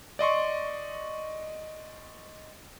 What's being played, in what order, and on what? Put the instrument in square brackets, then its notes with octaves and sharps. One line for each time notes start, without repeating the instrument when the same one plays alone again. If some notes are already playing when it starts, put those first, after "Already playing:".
[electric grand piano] D5 D#5 C6 C#6